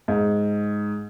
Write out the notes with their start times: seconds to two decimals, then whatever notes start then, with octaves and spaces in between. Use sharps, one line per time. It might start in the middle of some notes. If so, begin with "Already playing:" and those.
0.08 G#2